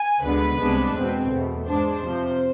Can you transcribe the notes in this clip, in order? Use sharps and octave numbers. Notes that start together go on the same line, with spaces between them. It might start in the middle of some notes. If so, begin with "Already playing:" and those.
Already playing: G#5
D2 D3 G#3 B3 B4
C2 C3 G#3 B3 D4
E2 B2 G#3 C4
E2 B2 A3
G#2 G#3 D4 C5
F2 C3 F3